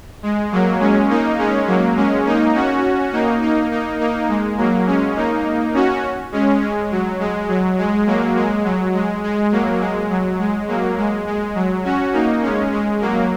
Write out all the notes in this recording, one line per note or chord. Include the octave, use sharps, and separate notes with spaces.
G#3
F#3 A#3
G#3 C#4
A#3 D#4
G#3 C#4
F#3 A#3
G#3 C#4
A#3 D#4
C#4 F#4
A#3 D#4
A#3 D#4
A#3 D#4
A#3 D#4
G#3
F#3 A#3
G#3 C#4
A#3 D#4
C#4 F#4
G#3 C#4
G#3
F#3
G#3
F#3
G#3
F#3 A#3
G#3
F#3
G#3
G#3
F#3 A#3
G#3
F#3
G#3
F#3 A#3
G#3
G#3
F#3
C#4 F#4
A#3 D#4
G#3 C#4
G#3
F#3 A#3